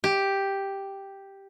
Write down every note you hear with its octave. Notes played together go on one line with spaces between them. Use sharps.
G4